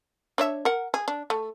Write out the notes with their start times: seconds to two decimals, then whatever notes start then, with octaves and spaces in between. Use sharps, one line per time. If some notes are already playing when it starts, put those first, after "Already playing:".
0.38 D4 C#5 E5
0.65 A#4 F#5
0.94 G#4
1.08 D4
1.30 A3